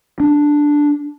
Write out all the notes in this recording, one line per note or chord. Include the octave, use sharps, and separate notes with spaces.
D4